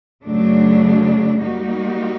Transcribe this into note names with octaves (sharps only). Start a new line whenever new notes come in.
F#2 C#3 F#3 A3 D4
G3 A#3 D#4 F#4